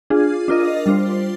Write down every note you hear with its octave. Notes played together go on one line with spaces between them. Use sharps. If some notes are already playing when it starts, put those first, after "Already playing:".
D4 F4 G#4
D4 F4 A#4 D#5
G3 D4 F4 C5